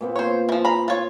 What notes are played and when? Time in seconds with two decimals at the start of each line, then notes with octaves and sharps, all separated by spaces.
0.01 A#2 B3 C4
0.16 C5 C#5
0.49 E3 F3
0.65 A#5 B5
0.88 F4 C#5